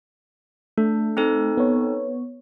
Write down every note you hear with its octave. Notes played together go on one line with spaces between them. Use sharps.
A3 D4
C4 D#4 A4
B3 C#5